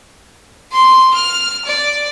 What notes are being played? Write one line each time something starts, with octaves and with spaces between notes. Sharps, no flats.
C6
F6
D5